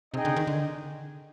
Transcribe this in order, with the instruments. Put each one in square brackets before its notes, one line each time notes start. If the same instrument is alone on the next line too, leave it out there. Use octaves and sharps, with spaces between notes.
[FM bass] C3 [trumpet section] D#4 G#4 D#5 G5
[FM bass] D3
D#3
D3